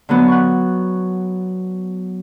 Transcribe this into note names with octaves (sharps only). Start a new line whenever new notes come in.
D3 F#3 B3
F#5 C#6